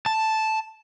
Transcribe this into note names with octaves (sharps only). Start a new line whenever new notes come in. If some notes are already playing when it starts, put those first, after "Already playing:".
A5